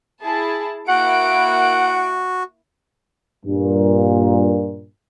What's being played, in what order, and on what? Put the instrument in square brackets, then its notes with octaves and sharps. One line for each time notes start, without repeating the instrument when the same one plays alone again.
[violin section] E4 G#4 A5
[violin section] A#3 E4 D7 [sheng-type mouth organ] F#4 [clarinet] F#5
[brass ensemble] G2 A#2